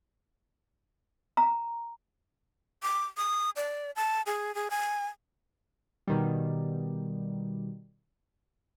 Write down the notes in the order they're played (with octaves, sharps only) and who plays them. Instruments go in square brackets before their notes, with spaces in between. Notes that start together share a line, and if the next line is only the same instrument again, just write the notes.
[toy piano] A#5
[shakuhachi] D6
D#6
D5
A5
G#4
G#4
G#5
[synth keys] B2 D#3 G3